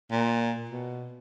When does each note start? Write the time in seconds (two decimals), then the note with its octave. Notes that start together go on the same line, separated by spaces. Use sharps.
0.11 A#2
0.70 B2